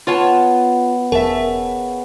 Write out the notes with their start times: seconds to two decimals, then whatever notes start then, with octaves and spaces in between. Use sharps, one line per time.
0.07 B3 F4 C#5 A5
1.12 E1 C#3 A#4 E5 A5